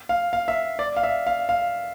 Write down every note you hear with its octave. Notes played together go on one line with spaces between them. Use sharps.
F5
F5
E5
D5
F5
E5
F5
F5